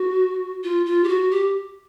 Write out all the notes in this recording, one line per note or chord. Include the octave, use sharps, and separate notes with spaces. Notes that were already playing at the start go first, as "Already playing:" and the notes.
Already playing: F#4
F4
F4
G4
F#4
G4